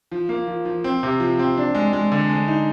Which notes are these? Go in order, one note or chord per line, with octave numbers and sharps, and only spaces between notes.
F3
A#3
F3
F3
C4
C3
F3
C4
D4
G#3
G#3
D3
G#3
D#4